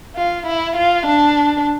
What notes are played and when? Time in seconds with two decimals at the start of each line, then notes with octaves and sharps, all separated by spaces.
0.16 F4
0.46 E4
0.76 F4
1.06 D4